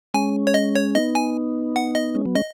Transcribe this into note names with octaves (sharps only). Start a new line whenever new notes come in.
G#3 C#4 G#5
C#5
D#5
C#5
B3 D#4 D#5
G#5
F#5
D#5
G#3 C#4
F#3 B3
G#3 C#4 D#5